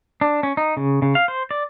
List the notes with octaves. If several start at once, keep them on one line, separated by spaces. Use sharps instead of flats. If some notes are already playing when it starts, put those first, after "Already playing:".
D4
C#4
D#4
C#3
C#3
F5
C5
D5